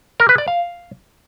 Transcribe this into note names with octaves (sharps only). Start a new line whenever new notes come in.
A#4
B4
D5
F5